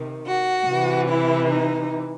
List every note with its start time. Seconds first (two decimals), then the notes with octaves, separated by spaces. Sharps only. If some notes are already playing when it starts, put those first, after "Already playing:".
Already playing: C3 D#3
0.26 F#4
0.67 C3 E3
1.09 E4
1.50 D#4